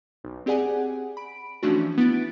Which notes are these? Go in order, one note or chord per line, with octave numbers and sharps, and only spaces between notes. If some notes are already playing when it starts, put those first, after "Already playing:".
B1
C4 G4 G#4 D5 F#5 G#5
B5 D7
E3 F3 A3 C#4 D4 F#4
B3 E4 A6 D7